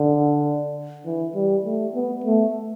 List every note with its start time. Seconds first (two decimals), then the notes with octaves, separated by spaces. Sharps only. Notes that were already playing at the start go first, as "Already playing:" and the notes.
Already playing: D3
1.06 E3
1.35 G3
1.65 A3
1.94 B3
2.24 A3